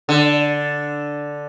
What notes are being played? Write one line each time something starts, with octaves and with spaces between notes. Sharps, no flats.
D3